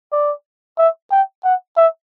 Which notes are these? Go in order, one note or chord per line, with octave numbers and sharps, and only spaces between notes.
D5
E5
G5
F#5
E5